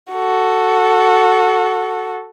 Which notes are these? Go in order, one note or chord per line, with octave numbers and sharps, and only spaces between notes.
F#4 A4